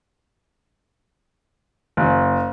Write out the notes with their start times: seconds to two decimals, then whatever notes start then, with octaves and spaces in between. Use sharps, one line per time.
1.97 F#1